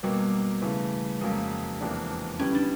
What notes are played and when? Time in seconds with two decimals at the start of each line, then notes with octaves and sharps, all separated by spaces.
0.03 B2 F#3 G3 A#3
0.62 C#3 E3 A3
1.21 F2 C#3 F#3 G#3 A#3
1.80 E2 C3 F3 A#3 D4
2.40 D3 G3 B3 C#4 E4
2.55 D4